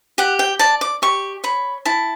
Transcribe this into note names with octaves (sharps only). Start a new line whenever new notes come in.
G4 F#5
G5
D5 A5
D6
G4 C#6
C#5 B5
E4 A5